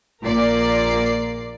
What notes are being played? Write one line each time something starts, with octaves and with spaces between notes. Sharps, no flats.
A#1 A#2 A#4 D5 C7